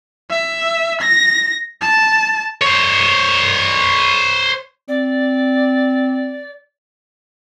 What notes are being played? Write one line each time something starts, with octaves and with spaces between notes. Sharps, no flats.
E5
A#6
A5
C5 C#5
C4 D5